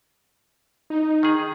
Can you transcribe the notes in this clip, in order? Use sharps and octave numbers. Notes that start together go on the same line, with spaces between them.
D#4
D#3 G#4